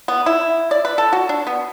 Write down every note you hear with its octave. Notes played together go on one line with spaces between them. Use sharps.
B3
E4
D5
B4
A4
F#4
D4
B3